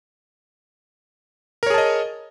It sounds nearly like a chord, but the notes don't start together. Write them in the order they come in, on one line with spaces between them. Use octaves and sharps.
A#4 C#5 G#4 A5 D#5